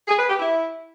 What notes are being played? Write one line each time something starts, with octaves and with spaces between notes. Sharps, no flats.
G#4
B4
G4
E4